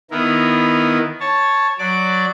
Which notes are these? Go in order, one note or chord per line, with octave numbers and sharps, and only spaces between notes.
D#3 B3 E4 A#4
C#5 A5
F#3 D5 D6